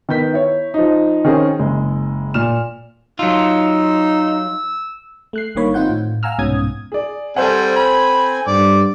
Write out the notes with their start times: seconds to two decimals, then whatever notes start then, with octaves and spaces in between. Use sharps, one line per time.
0.09 D#3 B3 G6 B6
0.33 E4 C#5
0.74 F3 D#4
1.25 D#3 C4 C#4 G#4
1.59 F#1 G#3
2.34 A#2 F6 E7
3.19 F#3 D#4 F4 E6
5.33 A3 F#6 C7
5.55 G1 G2 D#3 A#3 C#5 B5
5.74 D#3 C4 D#4 F4 F#5 G6
5.90 A2
6.23 F5 F#5 G#5 A#5 E6 F6
6.39 C2 G#2 B2 C#4 D#6 G#6
6.92 G#4 D5
7.36 G3 C4 A4 C5 F#5 G#5
7.76 B5
8.47 G2 D5